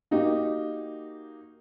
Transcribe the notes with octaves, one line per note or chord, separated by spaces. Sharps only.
A#3 D#4 F#4 G4